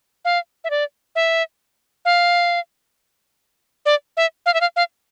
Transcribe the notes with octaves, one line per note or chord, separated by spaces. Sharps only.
F5
E5
D5
E5
F5
D5
E5
F5
E5
F5
F5